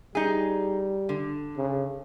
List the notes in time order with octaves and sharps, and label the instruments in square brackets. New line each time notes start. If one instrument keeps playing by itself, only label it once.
[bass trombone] G3 [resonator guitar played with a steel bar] D#4 G#4
[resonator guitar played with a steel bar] D3
[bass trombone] C#3